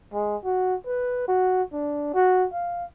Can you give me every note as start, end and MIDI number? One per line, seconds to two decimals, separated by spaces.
0.13 0.36 56
0.44 0.75 66
0.86 1.24 71
1.28 1.62 66
1.73 2.11 62
2.14 2.46 66
2.53 2.84 77